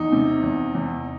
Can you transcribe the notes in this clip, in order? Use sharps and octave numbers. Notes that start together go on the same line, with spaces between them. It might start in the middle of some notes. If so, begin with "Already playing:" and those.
Already playing: E2 D#4
C3
E2
E2